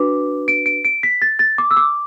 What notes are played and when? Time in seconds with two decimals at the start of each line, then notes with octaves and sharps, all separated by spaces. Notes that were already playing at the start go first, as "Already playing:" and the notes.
Already playing: D4 F#4 B4 D6
0.48 D7
0.66 D7
0.85 D7
1.03 B6
1.22 A6
1.39 A6
1.58 D6
1.71 E6
1.77 D6